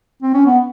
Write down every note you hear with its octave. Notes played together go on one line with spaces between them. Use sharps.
C4
C#4
B3